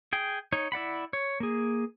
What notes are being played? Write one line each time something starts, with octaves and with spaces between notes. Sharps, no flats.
G#4 G5
D#4 C#5
E4 D5 F#5 B5
C#5
A#3 G#4